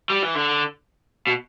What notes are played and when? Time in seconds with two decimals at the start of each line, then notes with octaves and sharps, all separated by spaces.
0.10 G3
0.22 E3
0.35 D3
1.27 B2